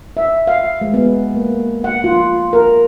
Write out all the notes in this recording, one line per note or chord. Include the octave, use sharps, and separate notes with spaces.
E5
F5
G#3
B3
A#3
F#5
F4
A#4